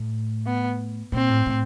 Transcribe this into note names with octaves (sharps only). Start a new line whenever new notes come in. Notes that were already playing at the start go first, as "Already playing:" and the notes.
Already playing: A2
B3
A#2 C4
A2
A2